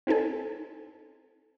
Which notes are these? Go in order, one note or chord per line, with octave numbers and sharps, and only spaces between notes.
C4 C#4 D#4 A4 G#5